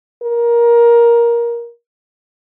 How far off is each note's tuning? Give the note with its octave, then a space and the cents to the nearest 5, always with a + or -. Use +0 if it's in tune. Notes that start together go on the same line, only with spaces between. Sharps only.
A#4 +15